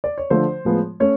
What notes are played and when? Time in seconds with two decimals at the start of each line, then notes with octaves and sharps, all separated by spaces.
0.04 D5
0.18 C#5
0.30 D3 F3 A3 C5
0.65 A2 F3 G#3 B3
1.00 A3 C#4 C#5